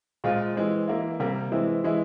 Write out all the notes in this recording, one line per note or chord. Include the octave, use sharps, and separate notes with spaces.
A#2 G#3 C4 F4
E3 G#3 C4
E3 A#3 E4
C3 G3 A#3
E3 G#3 C4 E4
E3 G#3 E4